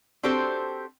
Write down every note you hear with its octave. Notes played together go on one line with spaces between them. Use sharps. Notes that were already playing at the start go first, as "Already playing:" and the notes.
C4 D4 F#4 G4 A4 C5